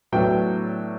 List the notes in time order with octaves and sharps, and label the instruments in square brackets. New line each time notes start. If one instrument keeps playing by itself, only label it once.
[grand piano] A2 F#3 B3 D4 G5